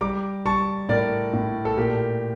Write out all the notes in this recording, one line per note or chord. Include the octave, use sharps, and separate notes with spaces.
G3 A#5 D6
G3 A5 C#6
A2 A#4 D5
A2
A4
A#2 G4 A#4